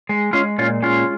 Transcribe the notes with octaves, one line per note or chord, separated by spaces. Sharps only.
G#3
G#3 C#4 F4
A#2 C#4 F4
G#3 C#4 F4